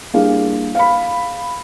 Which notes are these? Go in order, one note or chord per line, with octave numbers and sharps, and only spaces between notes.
G3 A#3 D4 E4 G#4 F5
F5 B5